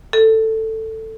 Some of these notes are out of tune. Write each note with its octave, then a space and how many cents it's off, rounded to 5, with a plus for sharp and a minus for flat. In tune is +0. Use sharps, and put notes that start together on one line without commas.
A4 +10